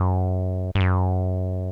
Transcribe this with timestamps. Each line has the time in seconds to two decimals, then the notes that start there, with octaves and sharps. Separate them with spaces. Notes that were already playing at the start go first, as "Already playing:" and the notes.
Already playing: F#2
0.75 G2
0.80 F#2